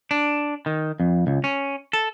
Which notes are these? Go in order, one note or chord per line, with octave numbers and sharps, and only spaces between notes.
D4
D#3
F2
C#2
C#4
A4